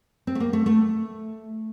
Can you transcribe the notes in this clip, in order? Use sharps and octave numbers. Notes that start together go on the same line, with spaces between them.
C4
A3
A#3
A3
A3